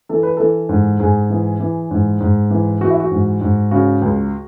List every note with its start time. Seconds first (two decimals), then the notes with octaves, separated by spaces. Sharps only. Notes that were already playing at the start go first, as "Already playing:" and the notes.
0.09 E3 A4
0.23 B4
0.37 E3 A4
0.69 G#2
1.00 G#2 G#4
1.30 E3
1.60 E3
1.91 G#2
2.20 G#2
2.50 E3
2.81 E3 F#4
2.90 E4
3.00 F#4
3.11 G#2
3.41 G#2
3.71 C#3 F#4
4.02 C#2